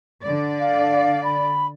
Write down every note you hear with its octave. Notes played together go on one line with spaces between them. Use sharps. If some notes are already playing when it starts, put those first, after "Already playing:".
D3 D5
F5
B5